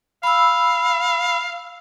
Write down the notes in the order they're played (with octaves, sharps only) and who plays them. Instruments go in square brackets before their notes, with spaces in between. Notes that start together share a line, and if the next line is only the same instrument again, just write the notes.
[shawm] F5 [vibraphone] B5 E6